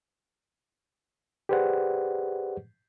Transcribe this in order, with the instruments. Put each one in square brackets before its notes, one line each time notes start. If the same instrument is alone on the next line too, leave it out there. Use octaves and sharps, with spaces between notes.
[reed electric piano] G4 G#4 B4 C5 D5 F#5